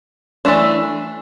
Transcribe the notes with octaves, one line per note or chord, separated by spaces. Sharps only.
E3 A3 D4